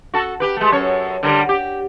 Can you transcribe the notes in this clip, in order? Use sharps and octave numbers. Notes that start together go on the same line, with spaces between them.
F#4 A4
G4 B4
G#3 A3
F#2 A4 C#5
D3 G3 A#4
G4